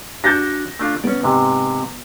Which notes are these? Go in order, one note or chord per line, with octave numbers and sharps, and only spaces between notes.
D4 F#4 A5 G6 A6 A#6
A3 D4 F4
B3 C#4 D5
G#2 C3